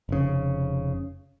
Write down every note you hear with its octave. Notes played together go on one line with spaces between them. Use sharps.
F1 C#3